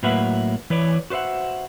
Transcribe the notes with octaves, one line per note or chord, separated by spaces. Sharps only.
A2 F#3 A#3 B4 E5 F#5
E3 B4 C#5 D5
F#4 B4 C5 E5 F#5